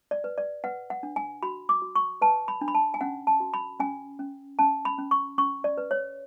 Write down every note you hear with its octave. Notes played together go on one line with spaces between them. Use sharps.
D5
B4
D5
B4 F#5
F#5
D4
G#5
F#4 B5
D6
F#4
C#6
B4 A5
B5
D4
B5
A5
G#5
C#4 F#5
A5
F#4
B5
C#4 G#5
C#4
C#4 A5
B5
C#4
C#6
C#4 C#6
D5
B4
C#5